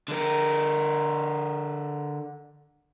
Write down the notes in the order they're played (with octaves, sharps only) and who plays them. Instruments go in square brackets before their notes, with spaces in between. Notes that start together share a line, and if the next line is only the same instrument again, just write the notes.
[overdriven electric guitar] D3 A#4